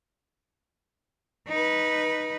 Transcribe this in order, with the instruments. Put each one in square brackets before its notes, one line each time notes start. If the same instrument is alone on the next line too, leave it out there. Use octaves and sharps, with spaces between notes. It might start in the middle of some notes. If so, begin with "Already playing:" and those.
[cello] D#4 B4